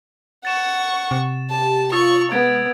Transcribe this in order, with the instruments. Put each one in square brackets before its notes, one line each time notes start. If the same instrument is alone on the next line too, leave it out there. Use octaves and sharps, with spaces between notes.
[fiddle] F#5 C#6 [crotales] A6 E7
[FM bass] C3
[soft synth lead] G4 [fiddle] A5
[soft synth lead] F4 [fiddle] C#6 [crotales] D#6 E6 A6
[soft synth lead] G#3 [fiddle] B3 [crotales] G#6 D7